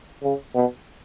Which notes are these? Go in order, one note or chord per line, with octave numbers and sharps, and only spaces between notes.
C#3
B2